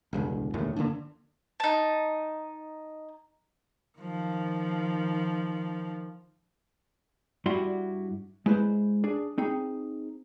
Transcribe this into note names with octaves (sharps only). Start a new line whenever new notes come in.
E1 C#2 G2 D3
E1 D#2 A2 D3
D3 F#3 A#3 D4
D#4 A5
D#3 F3
G2 G3 E4 F#4 C6
G#3 E4 B4 C5
D4 G#4
C4 D#4 G#4